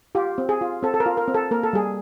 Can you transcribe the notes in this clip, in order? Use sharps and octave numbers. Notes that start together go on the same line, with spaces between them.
F4 G4
C4
G#4
F4
C4 A4
A4
A#4
F4
A#4
C4
A4
A#3 A#4
A4
G3 G#4